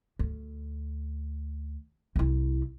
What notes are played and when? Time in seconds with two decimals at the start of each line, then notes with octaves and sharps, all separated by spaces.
0.19 D2
2.16 C2 E4